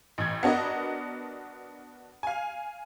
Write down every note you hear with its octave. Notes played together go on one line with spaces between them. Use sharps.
A1 G#6
B3 D4 F#4 A#4 D#5
F5 G#5